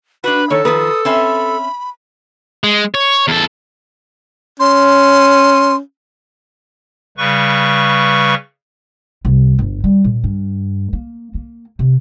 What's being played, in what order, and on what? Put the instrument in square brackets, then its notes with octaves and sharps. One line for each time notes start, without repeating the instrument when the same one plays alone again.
[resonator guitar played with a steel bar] D4 F#4 [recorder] B4 [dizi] B5
[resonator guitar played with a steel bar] D#3 [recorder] A4 [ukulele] C#5
[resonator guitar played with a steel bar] D#3 F3 [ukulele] B4 [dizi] D#6
[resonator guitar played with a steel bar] C4 C#4 E5 [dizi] B5
[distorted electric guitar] G#3
C#5
E2 A4
[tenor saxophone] C#4 [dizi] C6
[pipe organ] C#3 G3 B4 C#6
[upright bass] C2
G1
G3
A#2
G2
A#3
A#3
C3